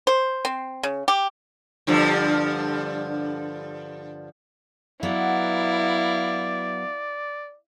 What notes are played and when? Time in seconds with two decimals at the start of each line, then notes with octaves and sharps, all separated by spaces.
0.07 C5
0.45 C4
0.83 C#3
1.08 G4
1.87 G2 D3 F3
5.03 F#3 B3 E4 D5 F5